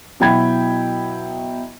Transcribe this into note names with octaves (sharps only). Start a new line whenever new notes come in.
B2 F#3 E4 G5 B5 G#6